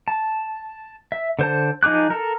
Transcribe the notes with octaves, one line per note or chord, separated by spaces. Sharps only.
A5
E5
D3 C5 A5
F3 D#4 G#4 D6 F#6
A4 A#4